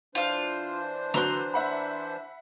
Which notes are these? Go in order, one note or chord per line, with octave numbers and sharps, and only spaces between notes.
E3 D4 F4 C5 F5
D3 F#3 B4 A#5 C6 F#6
E5 F#5 B5